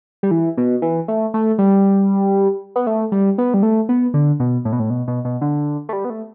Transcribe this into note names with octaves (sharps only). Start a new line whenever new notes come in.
G3
E3
B2
E3
A3
A3
G3
B3
A3
G3
B3
G3
A3
B3
D3
B2
A2
B2
A2
B2
B2
B2
D3
A3
G3
B3
A3